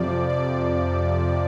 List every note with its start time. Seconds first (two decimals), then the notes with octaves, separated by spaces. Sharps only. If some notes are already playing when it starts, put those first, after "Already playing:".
Already playing: F2 C3 F3 D5
0.29 D5